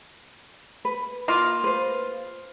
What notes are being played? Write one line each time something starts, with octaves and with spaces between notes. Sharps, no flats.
B4
A#3 F4
B4 C5